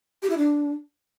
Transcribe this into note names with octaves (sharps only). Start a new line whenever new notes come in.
G4
E4
D4